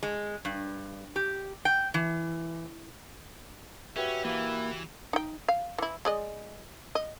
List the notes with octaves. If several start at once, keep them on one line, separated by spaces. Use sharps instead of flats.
G#3
G2
G4
G5
E3
C#4 F#4 G4 B4 E5
E3 A#3 E4
D#4 G5
F5
E3 E4
G#3 D5 D#5
D#5